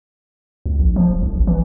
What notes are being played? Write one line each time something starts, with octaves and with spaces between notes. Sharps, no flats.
C#2
A#1
F3
D1
C2
A1
E3